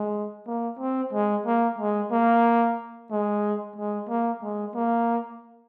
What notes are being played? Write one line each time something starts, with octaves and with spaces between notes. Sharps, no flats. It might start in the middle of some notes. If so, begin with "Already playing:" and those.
Already playing: G#3
A#3
C4
G#3
A#3
G#3
A#3
G#3
G#3
A#3
G#3
A#3